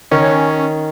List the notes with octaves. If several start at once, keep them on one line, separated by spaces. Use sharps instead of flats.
D#3 C#4